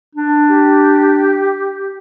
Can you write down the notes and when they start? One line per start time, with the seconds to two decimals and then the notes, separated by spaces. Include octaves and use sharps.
0.15 D4
0.49 G4